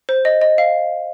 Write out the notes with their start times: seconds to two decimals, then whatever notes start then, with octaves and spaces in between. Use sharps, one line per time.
0.09 C5
0.25 D#5
0.42 D#5
0.58 F5